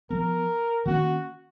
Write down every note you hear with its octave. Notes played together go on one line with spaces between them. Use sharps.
F3 B3 A#4
D#3 A#3 C#4 F#4